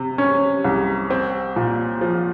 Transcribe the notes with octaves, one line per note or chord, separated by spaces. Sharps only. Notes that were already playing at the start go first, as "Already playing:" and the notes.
Already playing: C3
C#4
C2
C4
A#2
F3